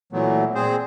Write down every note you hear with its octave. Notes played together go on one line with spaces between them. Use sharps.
A#2 E3 F#3 A3 B3
A#2 C4 G#4 C5